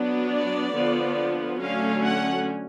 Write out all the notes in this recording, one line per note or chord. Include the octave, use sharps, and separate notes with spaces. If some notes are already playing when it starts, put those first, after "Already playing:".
Already playing: F#3 B3 D4
D5
D3 F3 B3
D3 F#3 A3 C#4 F5
F#5